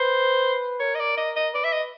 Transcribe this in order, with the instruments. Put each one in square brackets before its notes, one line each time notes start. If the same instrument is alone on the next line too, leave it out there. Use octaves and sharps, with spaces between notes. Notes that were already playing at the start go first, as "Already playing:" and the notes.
Already playing: [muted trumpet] B4 [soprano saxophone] C5
[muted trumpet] A#4 [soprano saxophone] C#5
[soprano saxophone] D#5
D5
D#5
D#5
[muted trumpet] B4 [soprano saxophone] D5
[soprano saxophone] E5
D#5